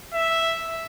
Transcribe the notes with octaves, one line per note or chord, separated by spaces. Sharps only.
E5